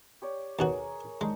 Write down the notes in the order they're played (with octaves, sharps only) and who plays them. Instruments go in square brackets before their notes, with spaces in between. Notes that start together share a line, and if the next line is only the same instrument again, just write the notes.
[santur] G4 C#5 D5
[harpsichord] D#2 B2 F#4 [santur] G#4 A#4 C#5
[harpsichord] G#3 [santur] D4 D#4 C#6